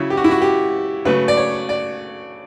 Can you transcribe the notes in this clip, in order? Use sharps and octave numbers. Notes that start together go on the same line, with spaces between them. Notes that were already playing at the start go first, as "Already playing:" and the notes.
Already playing: C#3 F#3 C#4 E4
G4
F#4
E4
F#4
G4
C#3 F#3 A3 B4
D5
C#5
D5